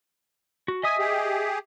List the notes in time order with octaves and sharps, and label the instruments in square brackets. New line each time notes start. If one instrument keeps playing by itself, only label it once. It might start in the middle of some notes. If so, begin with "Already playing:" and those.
[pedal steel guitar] F#4
[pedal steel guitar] D#5 E5 D#6 [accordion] G#5
[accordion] G4 G#4